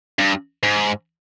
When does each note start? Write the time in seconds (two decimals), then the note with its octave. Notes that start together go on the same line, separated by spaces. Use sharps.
0.19 G2
0.63 G#2